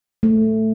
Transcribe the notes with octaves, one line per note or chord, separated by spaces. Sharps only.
A3